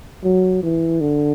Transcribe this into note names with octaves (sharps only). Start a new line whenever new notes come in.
F#3
E3
D3